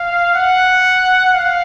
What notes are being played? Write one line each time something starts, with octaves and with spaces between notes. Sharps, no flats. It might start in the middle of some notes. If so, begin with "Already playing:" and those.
Already playing: F5
F#5
F5